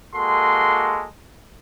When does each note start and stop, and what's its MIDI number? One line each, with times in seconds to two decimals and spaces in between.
0.14 1.06 56
0.14 1.06 58
0.14 1.06 66
0.14 1.06 69
0.14 1.06 84